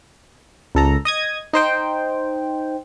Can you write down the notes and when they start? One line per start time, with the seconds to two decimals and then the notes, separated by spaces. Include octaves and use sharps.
0.75 C#2 A4 A#5
1.05 D#5 D#6 G#6
1.53 D#4 C5 G5